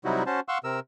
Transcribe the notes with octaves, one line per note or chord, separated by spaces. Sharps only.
C3 F#3 G3 D#4 E4 F#4
C#4 F#4 C5 A5
F5 F#5 C6 C#6 E6
C3 A#4 E6